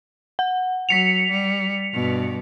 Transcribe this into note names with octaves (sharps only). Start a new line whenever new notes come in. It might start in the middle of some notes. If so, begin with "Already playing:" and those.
F#5
F#3 B6 C#7 F7
G3
G2 B2